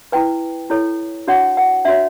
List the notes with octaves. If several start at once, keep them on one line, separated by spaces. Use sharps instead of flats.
E4 B4 G5
E4 A4 C#5
D4 F#4 C#5 F#5
F#5
D4 F#4 C#5 E5